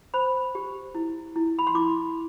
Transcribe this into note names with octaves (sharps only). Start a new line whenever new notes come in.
C5 B5
G4
E4
E4
B5
C6
E4 D6